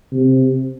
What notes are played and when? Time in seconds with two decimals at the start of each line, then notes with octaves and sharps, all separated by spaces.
0.13 C3